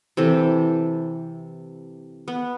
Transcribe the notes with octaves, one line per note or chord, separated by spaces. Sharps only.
C3 E3 A4
B3